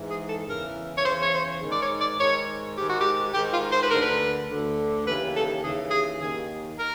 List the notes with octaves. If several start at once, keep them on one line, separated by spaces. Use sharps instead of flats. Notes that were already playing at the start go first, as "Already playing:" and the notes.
Already playing: G#2 E3
G#4
A4
E2 C#3 E3 A#4
C#5
E2 C#3 E3 C5
C#5
C5
G#2 D#3
D5
C#5
D5
G#2 D#3 C#5
G#2 D#3 G4
F#4
G4
G#2 D#3 G4
F4
C5
B4
D2 D3 A#4
B4
D2 D3
D#2 C#3 E3 B4
A4
D#2 C#3 E3 G#4
G#4
D#2 D#3 G#4
D#3 A#4